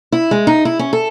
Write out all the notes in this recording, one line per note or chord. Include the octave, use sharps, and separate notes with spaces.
E4
G#3
D#4
E4
C#4
A4